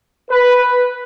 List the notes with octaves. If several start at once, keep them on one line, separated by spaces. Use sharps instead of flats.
B4